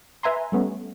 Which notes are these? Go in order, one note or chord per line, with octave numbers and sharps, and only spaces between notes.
B4 E5 G#5 A#5 C6
G3 A3 B3 C#4